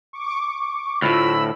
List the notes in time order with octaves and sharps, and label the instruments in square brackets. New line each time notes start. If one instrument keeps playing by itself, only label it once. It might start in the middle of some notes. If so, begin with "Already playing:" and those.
[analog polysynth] C#6 D6
[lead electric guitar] D2 A2 [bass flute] F4 [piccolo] B5 [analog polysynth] E6